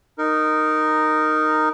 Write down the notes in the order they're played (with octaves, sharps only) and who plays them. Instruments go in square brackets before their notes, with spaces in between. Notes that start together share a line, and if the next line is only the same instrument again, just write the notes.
[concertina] D#4 A#4